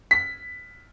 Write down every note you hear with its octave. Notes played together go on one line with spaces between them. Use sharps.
B6